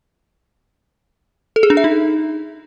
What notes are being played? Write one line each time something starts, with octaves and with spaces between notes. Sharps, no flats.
A4
G#4
D4
E5
D#4